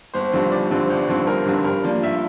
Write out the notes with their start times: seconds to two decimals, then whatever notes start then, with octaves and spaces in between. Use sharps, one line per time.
0.14 G1 C5
0.33 G2 D3 F3 C4
0.51 G1 D5
0.70 G2 D3 F3 C4
0.90 G1
1.08 G2 D3 F3 C4
1.27 G1 A#4
1.46 G2 D3 F3 C4
1.64 G2 A#4
1.84 F3 A#3 D4
2.03 G2 E5